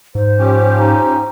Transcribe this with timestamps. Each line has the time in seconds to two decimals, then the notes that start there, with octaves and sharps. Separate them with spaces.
0.15 G#2 C5
0.39 F3 C#4 G4
0.78 D#4